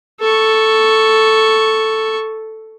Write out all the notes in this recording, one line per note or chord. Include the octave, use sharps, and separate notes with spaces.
A4 C#6